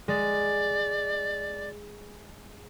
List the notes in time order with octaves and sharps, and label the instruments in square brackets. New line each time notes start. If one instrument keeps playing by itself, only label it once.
[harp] G#3 [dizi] D5